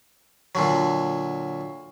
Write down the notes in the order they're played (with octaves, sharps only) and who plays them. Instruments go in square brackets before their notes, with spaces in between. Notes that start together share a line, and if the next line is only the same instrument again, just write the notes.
[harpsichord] A#2 D3 F#3